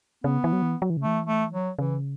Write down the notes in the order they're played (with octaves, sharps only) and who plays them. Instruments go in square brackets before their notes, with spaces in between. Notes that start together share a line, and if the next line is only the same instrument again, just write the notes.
[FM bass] C#3 [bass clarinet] B3
[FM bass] E3
F#3
E3
F#3
E3
C#3
[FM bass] E3 [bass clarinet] A3
[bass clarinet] A3
F#3
[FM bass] C#3 [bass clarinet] E3